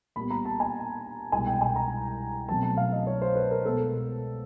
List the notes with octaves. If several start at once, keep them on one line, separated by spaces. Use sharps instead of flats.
A#2 G3 B3 B5
A#5
A5
G#5
C2 B2 G#3 G#5
G5
G#5
A#5
B2 F#3 A3 C4 A5
A5
F5
D#5
C#5
C5
B4
A#4
B2 G#3 B3 A4